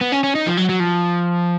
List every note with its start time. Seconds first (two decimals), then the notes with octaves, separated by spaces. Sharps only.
0.01 B3
0.12 C#4
0.24 C#4
0.35 D#4
0.47 F3
0.57 F#3
0.69 F#3
0.80 F3